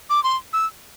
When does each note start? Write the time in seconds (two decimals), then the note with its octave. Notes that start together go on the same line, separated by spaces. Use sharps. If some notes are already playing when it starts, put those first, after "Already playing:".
0.10 D6
0.24 C6
0.53 E6